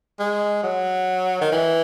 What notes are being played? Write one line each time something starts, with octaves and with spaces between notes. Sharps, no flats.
G#3
F#3
D#3
E3